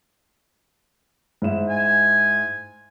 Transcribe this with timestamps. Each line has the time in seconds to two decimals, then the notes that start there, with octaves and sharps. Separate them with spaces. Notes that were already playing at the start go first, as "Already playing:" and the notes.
1.42 G#2 E4 E7
1.70 G#5